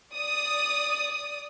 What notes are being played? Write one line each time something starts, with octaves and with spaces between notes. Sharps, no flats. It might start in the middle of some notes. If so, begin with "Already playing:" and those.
D5 D#6